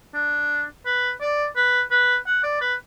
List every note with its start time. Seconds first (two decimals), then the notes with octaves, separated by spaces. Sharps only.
0.14 D4
0.86 B4
1.21 D5
1.56 B4
1.91 B4
2.27 F#5
2.44 D5
2.61 B4